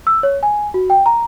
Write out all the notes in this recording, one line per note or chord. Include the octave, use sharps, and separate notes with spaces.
E6
C#5
G#5
F#4
G5
A#5